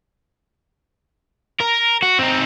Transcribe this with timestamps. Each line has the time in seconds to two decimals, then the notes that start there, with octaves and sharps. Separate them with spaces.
1.60 A#4
2.02 F#4
2.19 C4 D#4